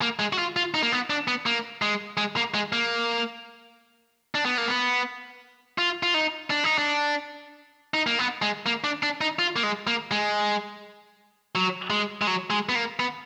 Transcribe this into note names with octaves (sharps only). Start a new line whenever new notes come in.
A#3
G#3
F#4
F4
F4
D#4
A#3
B3
D4
B3
A#3
G#3
G#3
A#3
G#3
A#3
D4
B3
A#3
B3
F4
F4
D#4
D4
D#4
D4
D#4
A#3
B3
G#3
A#3
D4
D4
D#4
F4
A#3
G#3
A#3
G#3
F#3
G#3
G#3
F#3
G#3
B3
A#3
B3